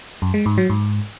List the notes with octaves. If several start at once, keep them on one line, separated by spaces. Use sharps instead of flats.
F#2
G#3
G#2
F#3
G#2